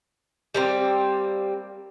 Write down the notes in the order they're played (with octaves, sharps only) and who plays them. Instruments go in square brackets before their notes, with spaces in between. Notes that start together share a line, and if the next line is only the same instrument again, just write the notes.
[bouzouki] G3 A#3 C4